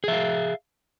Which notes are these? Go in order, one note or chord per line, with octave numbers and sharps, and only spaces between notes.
G#4 E5 F5